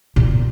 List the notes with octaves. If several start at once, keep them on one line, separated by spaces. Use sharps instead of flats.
A#2